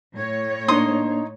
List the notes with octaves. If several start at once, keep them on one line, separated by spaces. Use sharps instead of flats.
A2 C#5
A#3 D4 D#4 C6 D#6